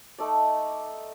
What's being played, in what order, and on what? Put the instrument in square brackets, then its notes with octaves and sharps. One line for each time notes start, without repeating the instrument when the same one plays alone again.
[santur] A3 D#4 D5